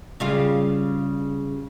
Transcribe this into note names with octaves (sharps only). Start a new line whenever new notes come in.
C#3 G3 F4